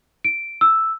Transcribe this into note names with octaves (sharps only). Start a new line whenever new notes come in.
D7
E6